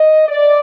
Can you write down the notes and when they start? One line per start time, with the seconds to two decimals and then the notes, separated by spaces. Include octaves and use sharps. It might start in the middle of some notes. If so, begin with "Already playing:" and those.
Already playing: D#5
0.28 D5